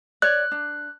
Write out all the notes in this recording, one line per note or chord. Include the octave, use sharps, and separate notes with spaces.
C#5 D5 F#6
D4